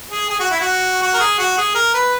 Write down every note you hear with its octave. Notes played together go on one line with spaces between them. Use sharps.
G#4
G#4
F#4
E4
F#4
F#4
A#4
G#4
F#4
G#4
A#4
B4